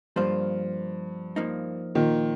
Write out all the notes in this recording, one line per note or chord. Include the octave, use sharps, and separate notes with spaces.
G2 F3 A#3 F4 C5
F3 A#3 D#4
A#2 D#3